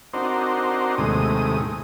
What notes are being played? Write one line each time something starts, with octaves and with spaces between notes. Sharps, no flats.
C4 D4 D#4 F#4 A#4 C5
D#2 A2 C3 G#3 D#6